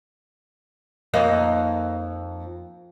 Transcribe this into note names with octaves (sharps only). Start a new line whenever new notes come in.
F2 A#3 D#4